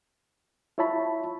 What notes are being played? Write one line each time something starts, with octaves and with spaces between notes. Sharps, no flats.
E4 F4 C#5 E5 A5 B5